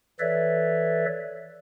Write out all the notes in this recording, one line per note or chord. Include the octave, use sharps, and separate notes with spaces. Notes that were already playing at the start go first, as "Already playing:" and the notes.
E3 A4 B4 C#5 D5 E5